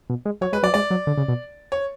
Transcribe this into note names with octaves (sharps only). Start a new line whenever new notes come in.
B2
G#3
F#3 C#5
G#3 B4
F#3 D5
G#3 D5
F#3
D3
C#3
B2
C#5